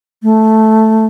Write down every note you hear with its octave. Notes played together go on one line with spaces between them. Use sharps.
A3